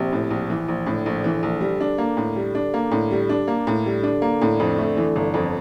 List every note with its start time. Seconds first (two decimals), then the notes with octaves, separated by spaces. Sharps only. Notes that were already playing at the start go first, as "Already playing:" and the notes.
Already playing: A#1 C3
0.12 A2
0.30 A#1
0.50 E3
0.68 A#1
0.86 A2 D3
1.06 A#1
1.24 E3
1.43 A#1
1.61 G3
1.80 D4
1.98 A#3
2.17 A2
2.36 G3
2.55 D4
2.74 A#3
2.91 A2
3.11 G3
3.29 D4
3.48 A#3
3.67 A2
3.85 D3 G3
4.03 D4
4.22 A#3
4.41 A2
4.60 F2
4.78 A3
4.97 E3
5.16 G1
5.34 F2